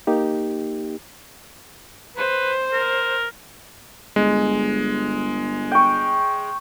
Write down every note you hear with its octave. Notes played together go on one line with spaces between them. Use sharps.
A#3 D#4 G4
B4 C5
A#4
G1 G#3
G5 C#6